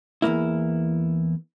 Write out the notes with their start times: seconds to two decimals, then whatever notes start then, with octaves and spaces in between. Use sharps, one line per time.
0.22 E2 G2 A#3 E4